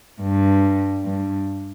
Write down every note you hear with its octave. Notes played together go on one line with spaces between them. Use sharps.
G2
G2